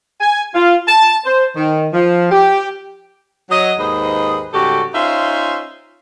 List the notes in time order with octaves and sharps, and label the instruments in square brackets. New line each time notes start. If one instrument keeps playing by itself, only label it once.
[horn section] G#5
F4
A5
C5
D#3
F3
G4
[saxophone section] F#3 D#5
D#2 G#2 G#4 B4 C5 D#5
G#2 C#3 G3 F#4 G4 A4
C#4 D#4 F4 C5 E5